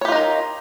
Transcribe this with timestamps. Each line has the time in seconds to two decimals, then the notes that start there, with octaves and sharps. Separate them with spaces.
0.01 C#5
0.05 G4
0.08 F4
0.12 D#4
0.15 A#4